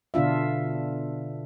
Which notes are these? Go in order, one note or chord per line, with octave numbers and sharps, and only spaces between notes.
B2 D3 D4 F4 E5